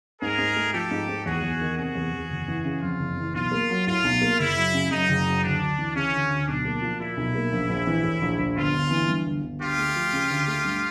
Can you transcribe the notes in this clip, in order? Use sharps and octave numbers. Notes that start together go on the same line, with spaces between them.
G#2 G#4 A#4
G#2
A3
F3 G4 A4
G#2
G#2
E2 F#4 G#4
E2
D#3
C3 F#4 G#4
E2
E2
F#1
E3
C#3
F2 F4
F#1
E3
B1 F4
A#3
F#3
A2 F4
B1
A#3
F#1 E4
F#3
C#3
F#2 D#4
F#1
F#3
D2 D4
D2
E3
C#3 C#4
D2
D2
B1 D4
A#3
F3
A#2 E4
B1
A#3
A#1
A#1
E3
A2
A#1
A#1
G1 F4
G1
E3
G2
G1
G1
D2 F4 G4
A3
F3
C#3
D2
A3
G2